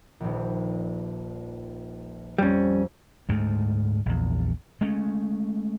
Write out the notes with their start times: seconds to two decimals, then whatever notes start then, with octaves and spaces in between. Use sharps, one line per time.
0.20 D#1 A#1
2.38 F2 G3 C4 C#4
3.29 D2 G#2 A3
4.06 A#1 E2
4.81 G#3 A3 C#4